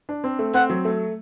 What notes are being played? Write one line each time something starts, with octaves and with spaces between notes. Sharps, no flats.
D4
C4
A3
C4 F#5
F#3
A3